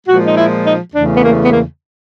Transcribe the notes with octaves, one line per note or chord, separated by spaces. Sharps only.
A#2 F3 G#3 F#4
D#4
E4
D#4
E2 C#3 E3 A3 D4
B3
A#3
B3
A#3